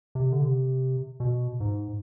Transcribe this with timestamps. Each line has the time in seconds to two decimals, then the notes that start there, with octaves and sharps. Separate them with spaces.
0.15 C3
0.32 D3
0.41 C3
1.20 B2
1.60 G#2